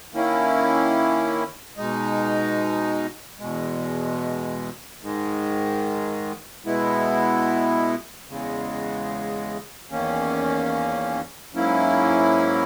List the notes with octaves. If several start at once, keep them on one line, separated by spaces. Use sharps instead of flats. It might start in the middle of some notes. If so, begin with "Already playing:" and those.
D#3 A#3 C#4 E4
B2 G#3 D#4
E2 B2 G#3
G#2 D#3 G#3
B2 G#3 B3 E4
E2 C#3 G#3
E2 D#3 A#3 C#4
G#2 F#3 A#3 C#4 E4